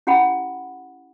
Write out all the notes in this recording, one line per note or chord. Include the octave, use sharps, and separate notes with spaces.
C#4 E4 G4 F#5 G5 B5